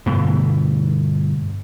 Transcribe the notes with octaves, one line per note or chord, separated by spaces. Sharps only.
G2 B2 D3 A3